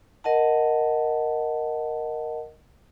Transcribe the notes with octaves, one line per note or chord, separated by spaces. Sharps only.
A#4 D#5 F#5 A5